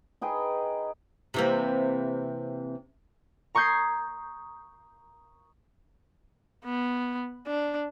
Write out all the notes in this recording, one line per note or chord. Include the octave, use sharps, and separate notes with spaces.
D#4 G#4 B4 G5
C3 E3 A#3
A#5 C#6 D#6 G6 G#6 C7
B3
D4